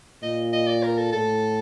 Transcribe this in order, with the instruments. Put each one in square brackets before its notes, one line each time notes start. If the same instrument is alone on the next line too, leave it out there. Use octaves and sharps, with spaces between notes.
[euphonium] A#2 [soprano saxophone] D#5
[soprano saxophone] D#5
D5
A#4
A4
[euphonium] A2 [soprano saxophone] A4